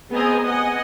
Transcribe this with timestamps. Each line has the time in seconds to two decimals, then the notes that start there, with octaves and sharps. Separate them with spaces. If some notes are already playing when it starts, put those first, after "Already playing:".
0.11 B3 C4 G#4 D#5 G#5 A#5
0.43 D#5 F#5 G#5